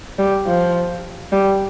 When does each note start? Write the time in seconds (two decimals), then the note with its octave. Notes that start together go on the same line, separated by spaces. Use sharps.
0.18 G3
0.47 F3
1.32 G3